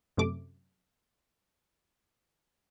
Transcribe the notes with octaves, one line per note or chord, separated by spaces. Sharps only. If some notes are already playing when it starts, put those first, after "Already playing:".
F#2 C3 A3 D6